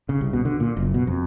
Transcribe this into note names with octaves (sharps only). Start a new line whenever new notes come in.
C#3
C2
B2
D3
A#2
F#1
B2
F2